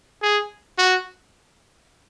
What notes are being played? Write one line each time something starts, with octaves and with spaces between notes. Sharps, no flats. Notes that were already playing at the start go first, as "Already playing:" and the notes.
G#4
F#4